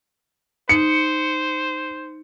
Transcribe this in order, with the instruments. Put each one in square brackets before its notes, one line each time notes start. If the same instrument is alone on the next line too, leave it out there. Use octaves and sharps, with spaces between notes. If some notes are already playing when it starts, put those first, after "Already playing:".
[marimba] D#4 [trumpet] C5 [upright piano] C#7